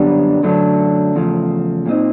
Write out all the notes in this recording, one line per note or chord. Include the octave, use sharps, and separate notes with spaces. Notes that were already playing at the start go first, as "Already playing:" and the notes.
Already playing: F#2 D3 G3 B3 D4
F#2 D3 F#3 A3 D4
E2 C#3 F3 A3
A#2 G3 C4 D#4